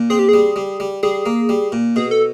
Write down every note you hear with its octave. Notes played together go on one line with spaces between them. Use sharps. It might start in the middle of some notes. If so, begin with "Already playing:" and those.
Already playing: A#2
C4 G#4
G4
G3 G#4
G3
G3
G3 G#4
A#3
G3
A#2
B2 G#4
A4